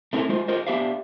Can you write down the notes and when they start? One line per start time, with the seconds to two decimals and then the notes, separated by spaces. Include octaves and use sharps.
0.13 A3 C4 E4 A4 A#4
0.29 G#3 F4 C5
0.48 F4 A#4 C5 D#5
0.67 B3 D4 G4 E5 F5